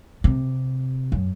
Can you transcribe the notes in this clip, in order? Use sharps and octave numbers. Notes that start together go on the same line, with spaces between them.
C3
F#2